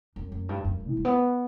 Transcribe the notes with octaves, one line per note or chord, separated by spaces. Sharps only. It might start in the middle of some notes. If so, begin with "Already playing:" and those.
F#2
F#2
G2
F#2
F#2
E3
G3
B3